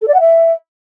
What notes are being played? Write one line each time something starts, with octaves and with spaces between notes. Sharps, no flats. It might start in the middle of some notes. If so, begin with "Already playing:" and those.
A4
D5
F#5
E5